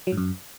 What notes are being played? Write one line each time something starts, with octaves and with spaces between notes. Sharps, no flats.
F#3
G#2
F#2